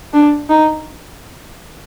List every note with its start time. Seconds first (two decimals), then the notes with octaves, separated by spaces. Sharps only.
0.13 D4
0.49 D#4